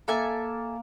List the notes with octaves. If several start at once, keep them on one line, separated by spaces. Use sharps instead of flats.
A#3 A4 E5 G#5